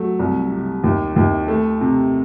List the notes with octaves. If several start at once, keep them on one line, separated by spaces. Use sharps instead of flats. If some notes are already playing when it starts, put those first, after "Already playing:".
Already playing: F#3 A3
C2
C3
D#2
D#2
A3
C3